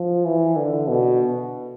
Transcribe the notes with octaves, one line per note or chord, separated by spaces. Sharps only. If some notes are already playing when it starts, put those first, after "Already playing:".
Already playing: F3
E3
D3
B2